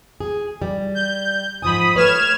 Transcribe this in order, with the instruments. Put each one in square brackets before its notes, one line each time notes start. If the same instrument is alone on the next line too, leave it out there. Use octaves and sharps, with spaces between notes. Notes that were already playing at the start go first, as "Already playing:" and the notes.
[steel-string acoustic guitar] G#4
G3
[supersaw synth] G6
[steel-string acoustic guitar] G#2 F3 G#5 [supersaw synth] B5 D#6
[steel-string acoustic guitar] A3 B4 C#5 [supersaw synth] F6 G#6 E7